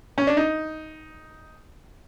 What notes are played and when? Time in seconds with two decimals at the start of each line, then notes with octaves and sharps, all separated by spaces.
0.18 C#4
0.27 D4
0.37 D#4